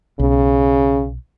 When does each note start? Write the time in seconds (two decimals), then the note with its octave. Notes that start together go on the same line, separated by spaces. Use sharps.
0.19 B1 C#3